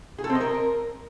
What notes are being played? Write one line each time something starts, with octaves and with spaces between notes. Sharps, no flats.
G#4
A4
C4
D#5
A#4